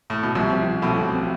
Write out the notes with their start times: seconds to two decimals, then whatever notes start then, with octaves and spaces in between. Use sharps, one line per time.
0.10 A2
0.23 B2
0.35 C2 C3 F3
0.51 C4
0.67 F3
0.82 B1 B2 A3
0.98 F3
1.14 C4